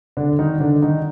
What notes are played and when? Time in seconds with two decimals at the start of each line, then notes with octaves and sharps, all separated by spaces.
0.17 D3 D4
0.39 D#3 D#4
0.60 D3 D4
0.82 D#3 D#4